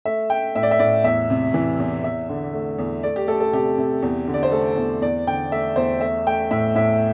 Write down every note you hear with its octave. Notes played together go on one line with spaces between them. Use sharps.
A3 E5
A3 G5
A2 E5
D5
E5
A2 D5
E2 E5
C3
E3
E2
E2 E5
D3
A3
E2
A3 D5
G4
A3 A4
A4
C3 G4
C3
E2
D3
D5
C5
A3 A4
E2
E2 D5
D3 G5
A3 E5
E2 C5
A3 E5
A3 G5
A2 E5
A2 E5